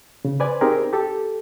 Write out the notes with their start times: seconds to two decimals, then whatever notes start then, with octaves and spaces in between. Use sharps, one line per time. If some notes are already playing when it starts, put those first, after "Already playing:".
0.25 C#3
0.40 B4 C5 D5 G#5
0.61 C4 D#4 G4 G#4 A#4
0.93 G4 A4